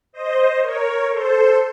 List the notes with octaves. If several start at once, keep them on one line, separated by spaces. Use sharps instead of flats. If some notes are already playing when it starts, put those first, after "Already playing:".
C5 D#5
A#4 C#5
A4 C5